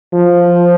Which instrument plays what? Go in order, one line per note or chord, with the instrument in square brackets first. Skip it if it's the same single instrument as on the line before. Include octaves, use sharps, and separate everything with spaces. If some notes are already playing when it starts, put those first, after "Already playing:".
[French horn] F3